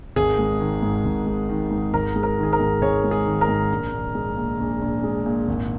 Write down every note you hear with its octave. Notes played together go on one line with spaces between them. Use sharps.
G#1 G#4
G#3
D#3
G#2
G#1
G#3
D#3
G#2
G#1 A#4
G#3
A#4
D#3 G#4
A#4
G#2
G#1 G#4 C#5
G#3
G#4
D#3
A#4
G#2
A#1
A#1
G#3
A#2
A#1
A#1
G#3
A#2
G#1